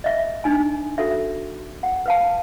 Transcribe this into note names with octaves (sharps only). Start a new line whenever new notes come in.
D#5 E5
D4 D#4 G#5
F#4 A4 E5
F#5
B4 F5 A5